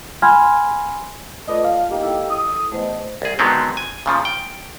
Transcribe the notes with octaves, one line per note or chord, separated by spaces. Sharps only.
F#5 G#5 B5 C6 F6 G#6
A3 F4 A4 B4 D5 D#5
F5
A#3 D#4 G4
E4 A4
D#6
E2 A3 C5 D#5
C2 G#4
D3 D#3 F#3 G#3 B3 C4
G#5
A#2 C#3 F3
G5